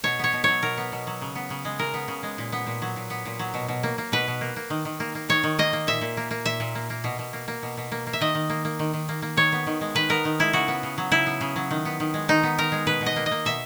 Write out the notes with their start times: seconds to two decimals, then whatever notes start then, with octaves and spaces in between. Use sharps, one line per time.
0.04 B2 C#5
0.19 B3 C#5
0.33 B2
0.44 F#3 C#5
0.63 B2 A#4
0.77 B3
0.92 B2
1.07 F#3
1.22 C#3
1.35 B3
1.50 C#3
1.65 G#3
1.79 C#3 A#4
1.94 B3
2.08 C#3
2.23 G#3
2.38 A#2
2.52 B3
2.66 A#2
2.82 F#3
2.96 A#2
3.10 B3
3.26 A#2
3.39 F#3
3.54 B2
3.68 B2
3.83 A#3
3.98 A#3
4.12 B2 B4
4.28 B2
4.41 A#3
4.56 A#3
4.70 D#3
4.85 D#3
5.00 A#3
5.15 A#3
5.29 D#3 C#5
5.43 D#3
5.59 A#3 D#5
5.73 A#3
5.87 A#2 E5
6.01 A#2
6.17 A#3
6.31 A#3
6.45 A#2 E5
6.60 A#2
6.75 A#3
6.90 A#3
7.04 B2
7.19 B2
7.33 A#3
7.48 A#3
7.63 B2
7.77 B2
7.92 A#3
8.07 A#3
8.13 E5
8.21 D#3 D#5
8.35 D#3
8.50 A#3
8.65 A#3
8.79 D#3
8.93 D#3
9.09 A#3
9.22 A#3
9.37 D#3 C#5
9.52 B3
9.67 D#3
9.81 G#3
9.95 D#3 B4
10.09 B3 A#4
10.25 D#3
10.39 G#3 E4
10.53 C#3 F#4
10.68 B3
10.83 C#3
10.98 F#3
11.12 C#3 E4
11.26 B3
11.41 C#3
11.56 F#3
11.71 D#3
11.85 B3
12.00 D#3
12.14 G#3
12.28 D#3 D#4
12.43 B3
12.58 D#3 A#4
12.72 G#3
12.87 B2 B4
13.01 B2
13.06 D#5
13.16 A#3
13.26 D#5
13.31 A#3
13.45 B2 E5